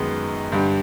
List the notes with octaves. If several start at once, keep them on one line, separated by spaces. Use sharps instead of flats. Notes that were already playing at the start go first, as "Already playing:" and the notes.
Already playing: F#2 D#3 G#3 B3
G2 D3 G3